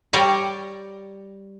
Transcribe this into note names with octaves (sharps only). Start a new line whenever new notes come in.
G3 C#5 D5 A#5